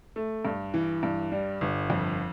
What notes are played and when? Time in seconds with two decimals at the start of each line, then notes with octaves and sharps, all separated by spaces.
0.16 A3
0.45 G2
0.74 E3
1.03 G2
1.32 G3
1.61 G1
1.90 F2